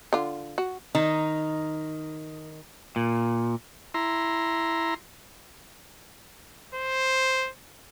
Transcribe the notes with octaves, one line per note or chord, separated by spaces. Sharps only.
D3 F4
F#4
D#3 D#4
A#2
E4 A#5 C6
C5